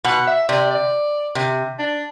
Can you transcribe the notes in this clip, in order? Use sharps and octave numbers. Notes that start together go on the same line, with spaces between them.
B2 F#5
E5
C3 D5
D5
C3
D4